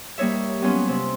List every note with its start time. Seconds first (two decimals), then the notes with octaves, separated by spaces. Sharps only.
0.18 G3 A#3 D#4 C#5 E5
0.61 F#3 G3 B3 C#4 F4
0.88 C3